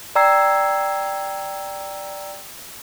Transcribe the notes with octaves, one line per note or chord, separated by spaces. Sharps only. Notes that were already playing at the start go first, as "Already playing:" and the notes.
D5 G5 A#5 E6 G#6 C7